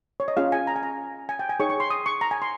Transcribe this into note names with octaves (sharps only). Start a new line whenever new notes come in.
C#5
D#5
C#4 F4 G#4 F5
G#5
A#5
G#5
A#5
G#5
G5
G#5
D#4 G#4 C#5 C#6
C#6
C6
D#6
C#6
A#5
G#5
C6